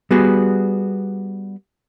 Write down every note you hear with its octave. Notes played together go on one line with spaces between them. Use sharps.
G3 B3 F#4 G#4